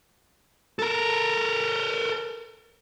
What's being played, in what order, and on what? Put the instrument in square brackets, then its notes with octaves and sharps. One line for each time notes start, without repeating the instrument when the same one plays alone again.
[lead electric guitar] A4 A#4